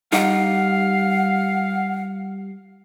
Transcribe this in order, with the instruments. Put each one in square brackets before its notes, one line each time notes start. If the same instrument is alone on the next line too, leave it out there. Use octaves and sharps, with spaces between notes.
[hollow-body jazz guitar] G3 D#4 F4 [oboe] F5 [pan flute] F#5